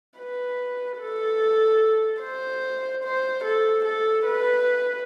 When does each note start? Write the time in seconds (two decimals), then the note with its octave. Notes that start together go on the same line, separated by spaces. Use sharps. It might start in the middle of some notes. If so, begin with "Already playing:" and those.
0.18 B4
1.00 A4
2.22 C5
3.04 C5
3.44 A4
3.85 A4
4.26 B4